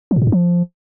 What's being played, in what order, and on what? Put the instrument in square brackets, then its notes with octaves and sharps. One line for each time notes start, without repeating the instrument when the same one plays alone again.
[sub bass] F3
A2
A#2
G2
F3